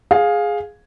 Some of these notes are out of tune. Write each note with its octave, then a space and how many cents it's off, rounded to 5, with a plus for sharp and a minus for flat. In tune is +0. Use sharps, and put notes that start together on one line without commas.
G#4 +0 F5 +15